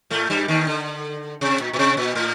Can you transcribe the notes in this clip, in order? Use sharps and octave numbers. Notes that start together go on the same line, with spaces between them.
A2 A3
G2 G3
D#2 D#3
D3
C3
A#2
A#2
C3
A#2
A2